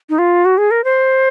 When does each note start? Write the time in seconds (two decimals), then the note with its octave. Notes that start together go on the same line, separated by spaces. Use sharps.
0.10 D#4
0.19 F4
0.45 F#4
0.58 G#4
0.71 A#4
0.84 C5